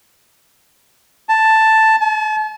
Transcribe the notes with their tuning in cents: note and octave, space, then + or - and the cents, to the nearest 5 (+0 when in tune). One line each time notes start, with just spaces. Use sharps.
A5 +5
A5 -40